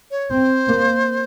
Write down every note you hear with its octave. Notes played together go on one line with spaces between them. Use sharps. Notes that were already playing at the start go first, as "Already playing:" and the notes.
C#5
C4 C5
A#3